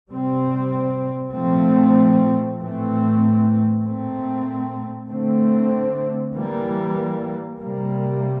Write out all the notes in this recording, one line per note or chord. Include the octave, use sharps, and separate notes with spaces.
C3 G3 C4
A#2 F3 A3 C4
A2 E3 A3 C4
A#2 A3 C4
D3 A3 C4
E3 G3 A#3
C3 G3 A#3